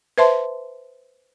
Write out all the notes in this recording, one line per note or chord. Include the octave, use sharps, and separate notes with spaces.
B4 C5 E5 A5 C6